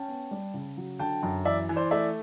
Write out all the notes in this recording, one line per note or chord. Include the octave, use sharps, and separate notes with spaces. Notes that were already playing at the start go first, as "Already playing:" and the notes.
Already playing: C#4 G5 A5
B3
G3
C#3
F#3
D3 G5 A5
F#2
E3 D5 E5
E3
C5 D5
A3 D5 E5